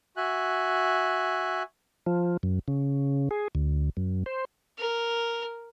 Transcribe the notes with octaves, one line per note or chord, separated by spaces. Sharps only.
F#4 E5 G#5 F#6
F3
F#2
C#3
G#4
D2
F#2
C5
A#4